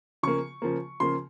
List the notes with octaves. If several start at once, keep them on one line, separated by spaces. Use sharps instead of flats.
C#3 F3 A#3 C#6
C#3 F3 A#3
C#3 F3 A#3 C6